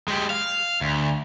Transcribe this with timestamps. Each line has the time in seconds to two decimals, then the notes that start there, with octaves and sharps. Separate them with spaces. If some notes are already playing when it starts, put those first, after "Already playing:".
0.08 G#3 G4
0.30 F5
0.81 D2